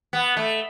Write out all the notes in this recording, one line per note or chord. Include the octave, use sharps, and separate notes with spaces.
B3
A3